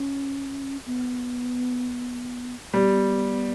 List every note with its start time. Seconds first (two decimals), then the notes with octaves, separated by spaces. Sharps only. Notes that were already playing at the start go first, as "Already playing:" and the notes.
Already playing: C#4
0.86 B3
2.74 G3 B3